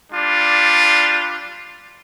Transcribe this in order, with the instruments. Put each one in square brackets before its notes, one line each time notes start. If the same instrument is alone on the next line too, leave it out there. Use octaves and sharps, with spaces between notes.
[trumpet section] G3 D4 F4